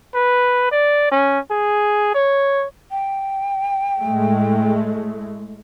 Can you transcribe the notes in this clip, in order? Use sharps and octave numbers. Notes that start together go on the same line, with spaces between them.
B4
D5
C#4
G#4
C#5
G5
A2 G#3 A3